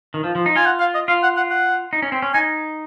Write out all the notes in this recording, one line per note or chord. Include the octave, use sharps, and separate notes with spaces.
D#3
F3
F3
D#4
F4 G#5
F#5
F5
D#5
F4 F5
F#5
F#5
F#5
D#4
C#4
C4
C#4
D#4 G#5